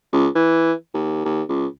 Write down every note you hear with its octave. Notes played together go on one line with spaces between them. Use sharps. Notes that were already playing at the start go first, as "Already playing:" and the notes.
C#2
E3
D#2
D#2
C#2